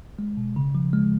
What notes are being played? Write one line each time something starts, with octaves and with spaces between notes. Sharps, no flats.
G#3
B2
C#3
F3
G#3